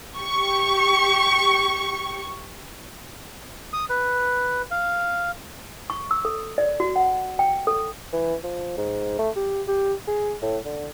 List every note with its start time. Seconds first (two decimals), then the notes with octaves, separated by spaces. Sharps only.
0.19 G4 C#6
3.73 D#6
3.90 B4
4.71 F5
5.90 C#6
6.11 E6
6.25 A4
6.58 D5
6.80 F#4
6.96 F#5
7.39 G5
7.67 A4
8.13 E3
8.43 F3
8.77 G#2
9.19 A3
9.36 G4
9.67 G4
10.07 G#4
10.42 A2
10.65 D3